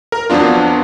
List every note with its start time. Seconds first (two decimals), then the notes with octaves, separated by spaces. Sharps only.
0.12 A#4
0.30 F2 F#3 B3 D4 F4